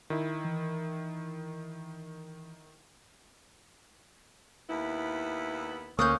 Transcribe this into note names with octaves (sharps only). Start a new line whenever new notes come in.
D#3 E4
E3
D#2 B3 E4
D2 A#3 C#4 D#6 F#6 G6